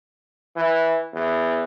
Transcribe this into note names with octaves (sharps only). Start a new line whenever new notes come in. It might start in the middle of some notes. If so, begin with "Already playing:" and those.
E3
E2